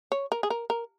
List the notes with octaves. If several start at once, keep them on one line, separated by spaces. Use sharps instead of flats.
C#5
A#4
G#4
A#4
A#4